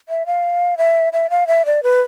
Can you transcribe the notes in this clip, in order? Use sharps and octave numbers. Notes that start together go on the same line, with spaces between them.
E5
F5
E5
E5
F5
E5
D5
B4